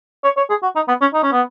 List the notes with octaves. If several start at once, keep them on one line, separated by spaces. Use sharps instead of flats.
C#5
C#5
G#4
F#4
D#4
B3
C#4
D#4
C#4
B3